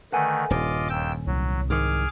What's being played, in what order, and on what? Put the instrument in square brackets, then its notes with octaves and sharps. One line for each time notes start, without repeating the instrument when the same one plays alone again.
[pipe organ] D3 D#3 A3 [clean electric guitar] B4 F#5 G#5
[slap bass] D#1 G2 [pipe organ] F4 D#5 D6
[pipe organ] D#2 G5 E6
[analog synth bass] C2 [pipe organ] F#3
[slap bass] G#2 D#3 [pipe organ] G#4 D6 F6